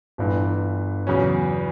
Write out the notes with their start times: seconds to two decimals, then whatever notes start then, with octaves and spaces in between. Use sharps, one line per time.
0.18 G1 G2 E3
1.07 E2 C#3 F#3 C#4